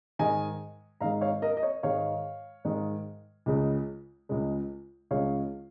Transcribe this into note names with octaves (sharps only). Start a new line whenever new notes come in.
G#2 D#3 G#3 D#5 G#5
G#2 D#3 G#3 F5 A#5
C#5 F5
A#4 D#5
D#5
C#5
G#2 D#3 G#3 C#5 F5
G#2 D#3 G#3
C#2 C#3 G#3
C#2 C#3 G#3
C#2 C#3 G#3 C#5 F5